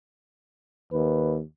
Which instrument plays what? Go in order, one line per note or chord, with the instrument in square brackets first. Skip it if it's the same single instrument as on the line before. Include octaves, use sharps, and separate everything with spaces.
[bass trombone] D#2 [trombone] B4